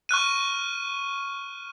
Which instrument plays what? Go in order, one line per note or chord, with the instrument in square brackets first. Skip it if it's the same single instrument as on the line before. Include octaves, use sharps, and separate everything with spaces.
[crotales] C#6 F6 F#6 D#7